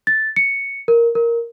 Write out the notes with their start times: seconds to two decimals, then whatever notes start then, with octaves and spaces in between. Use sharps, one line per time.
0.07 A6
0.36 C#7
0.88 A#4
1.15 A#4